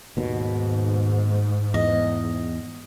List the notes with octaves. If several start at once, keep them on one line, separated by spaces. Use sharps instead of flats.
D#2 G#2 B2
E2 D#5